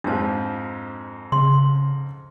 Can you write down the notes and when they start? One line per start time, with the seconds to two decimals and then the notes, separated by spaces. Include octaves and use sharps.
0.04 F2 G#2 F3 D4 A5
1.32 C#3 C6